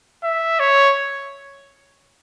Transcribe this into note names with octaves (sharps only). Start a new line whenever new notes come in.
E5
C#5